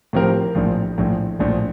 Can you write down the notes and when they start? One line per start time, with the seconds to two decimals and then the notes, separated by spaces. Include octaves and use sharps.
0.13 A2 F3 C4 G4 A#4
0.55 A#1 A2 F3
0.98 A#1 A2 F3
1.39 A#1 A2 F3